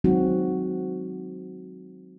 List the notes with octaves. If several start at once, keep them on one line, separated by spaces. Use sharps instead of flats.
D#3 F#3 G#3 C4 D#4 F#4